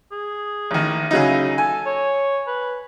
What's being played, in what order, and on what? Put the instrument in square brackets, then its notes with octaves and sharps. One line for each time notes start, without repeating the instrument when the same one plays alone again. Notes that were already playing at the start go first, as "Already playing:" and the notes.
[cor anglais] G#4
[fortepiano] A1 D#3
[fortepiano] C#3 F#3 D#4 [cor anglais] E4
[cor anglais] A4 [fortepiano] G#5
[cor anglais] C#5
B4